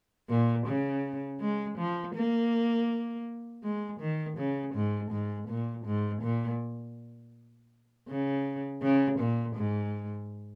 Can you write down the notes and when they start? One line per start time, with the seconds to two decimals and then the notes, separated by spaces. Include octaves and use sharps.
0.29 A#2
0.67 C#3
1.41 G#3
1.78 F3
2.15 A#3
3.63 G#3
4.00 D#3
4.37 C#3
4.74 G#2
5.11 G#2
5.48 A#2
5.85 G#2
6.22 A#2
8.08 C#3
8.82 C#3
9.19 A#2
9.56 G#2